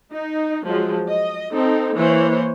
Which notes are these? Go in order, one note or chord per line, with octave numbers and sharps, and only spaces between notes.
D#4
F3 F#3 G#3
D#5
C4 D#4 A4
E3 A#3 C5 C#5